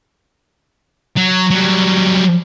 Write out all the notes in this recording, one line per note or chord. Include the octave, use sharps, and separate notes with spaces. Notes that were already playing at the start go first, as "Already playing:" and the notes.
F#3
F#3 G3